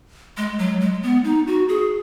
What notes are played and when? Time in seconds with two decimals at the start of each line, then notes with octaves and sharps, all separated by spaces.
0.37 G#3
0.59 F#3
0.81 G#3
1.03 B3
1.24 D#4
1.47 F#4
1.69 G#4